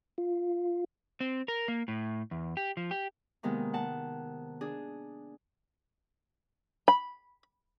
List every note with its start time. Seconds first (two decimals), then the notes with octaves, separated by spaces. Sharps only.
0.18 F4
1.20 C4
1.48 A#4
1.68 A#3
1.88 A2
2.31 E2
2.57 G4
2.77 F3
2.91 G4
3.43 C3 D#3 G#3 A#3 B3
3.73 F#5 A5
4.61 D4 G#4
6.88 B5